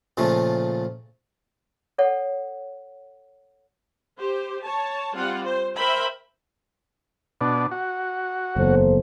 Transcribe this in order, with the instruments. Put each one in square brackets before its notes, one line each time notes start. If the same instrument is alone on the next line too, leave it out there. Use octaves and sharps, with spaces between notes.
[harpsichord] A#2 C#3 F3 A3
[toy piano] A4 C#5 F#5
[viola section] G4 C5
C#5 A5
G3 C4 F4 F#5
C5
A#4 C5 E5 G5 B5
[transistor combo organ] B2 D4
F#4
[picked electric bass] F#1 E2 [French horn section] A#3 A4 C5